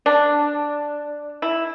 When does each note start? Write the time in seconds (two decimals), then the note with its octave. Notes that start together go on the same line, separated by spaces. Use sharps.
0.06 D4
1.42 E4